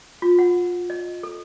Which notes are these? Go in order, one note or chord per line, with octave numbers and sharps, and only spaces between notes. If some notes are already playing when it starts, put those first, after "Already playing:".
F4
F#5
D#5
A4